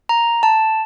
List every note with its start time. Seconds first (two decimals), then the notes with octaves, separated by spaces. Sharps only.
0.09 A#5
0.43 A5